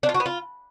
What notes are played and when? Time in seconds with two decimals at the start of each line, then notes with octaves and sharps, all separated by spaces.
0.03 D4
0.09 F4
0.14 F#4
0.20 B3
0.26 F4